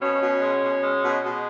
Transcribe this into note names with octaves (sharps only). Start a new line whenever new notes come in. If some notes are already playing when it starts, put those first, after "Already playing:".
B2 C#4
B2
G#3
B2
G#3
B2
B2 G#3